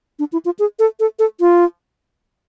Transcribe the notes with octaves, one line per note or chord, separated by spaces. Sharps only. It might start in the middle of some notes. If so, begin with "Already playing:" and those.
D4
E4
F4
G#4
A4
A4
A4
F4